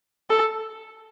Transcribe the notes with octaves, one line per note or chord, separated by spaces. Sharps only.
A4